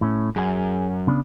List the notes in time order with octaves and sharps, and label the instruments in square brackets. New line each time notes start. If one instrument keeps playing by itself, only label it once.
[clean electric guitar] A2 A3 C#4
[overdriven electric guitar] F#2 [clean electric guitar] G#4 G#5
[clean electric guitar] C#3 B3 D4